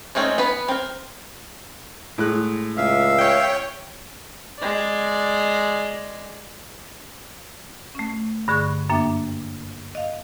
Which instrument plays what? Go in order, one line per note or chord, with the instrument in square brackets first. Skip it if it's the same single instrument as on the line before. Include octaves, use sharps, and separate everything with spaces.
[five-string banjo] G#3 A3 C4 C#4 D#4
B3 B4 B5
C4 A#4
[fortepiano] A2 G#3 F#6
[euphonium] C#2 [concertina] E5 F5
[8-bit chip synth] C#5 G5
[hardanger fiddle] G#3 D5
[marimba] A3 C#4
G2 D3 G#4 C#6 F#6
F#2 A#3 D4 E5 G5 D6
D#5 F5